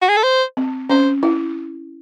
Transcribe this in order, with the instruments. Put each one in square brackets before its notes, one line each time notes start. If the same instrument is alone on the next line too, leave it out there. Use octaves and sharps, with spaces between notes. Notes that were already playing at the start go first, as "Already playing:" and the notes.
[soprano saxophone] F#4
G#4
A4
C5
[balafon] C4
[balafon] C#4 [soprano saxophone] C5
[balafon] E4